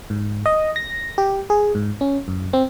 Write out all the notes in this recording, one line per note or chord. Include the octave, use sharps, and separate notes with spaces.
G#2
D#5
A#6
G4
G#4
G#2
C#4
F#2
C4